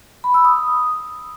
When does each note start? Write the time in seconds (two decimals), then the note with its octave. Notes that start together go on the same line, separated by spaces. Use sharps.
0.24 B5
0.34 E6
0.45 D#6